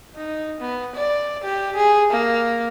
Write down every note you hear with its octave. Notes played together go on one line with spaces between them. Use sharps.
D#4
B3
D5
G4
G#4
A#3